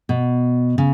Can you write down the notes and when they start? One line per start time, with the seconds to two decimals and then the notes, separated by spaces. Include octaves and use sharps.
0.09 B2
0.78 C#3